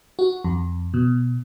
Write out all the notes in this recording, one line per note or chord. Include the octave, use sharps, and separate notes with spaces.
F#4
F2
B2